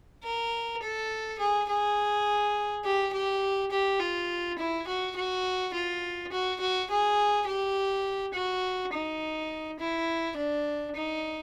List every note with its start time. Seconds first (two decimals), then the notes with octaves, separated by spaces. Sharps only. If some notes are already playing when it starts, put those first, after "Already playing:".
0.23 A#4
0.82 A4
1.39 G#4
1.69 G#4
2.85 G4
3.13 G4
3.71 G4
4.00 F4
4.58 E4
4.87 F#4
5.16 F#4
5.73 F4
6.32 F#4
6.60 F#4
6.90 G#4
7.47 G4
8.33 F#4
8.92 D#4
9.79 E4
10.37 D4
10.95 D#4